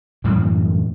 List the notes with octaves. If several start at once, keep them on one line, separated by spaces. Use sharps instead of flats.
F#2 A2 E3 G3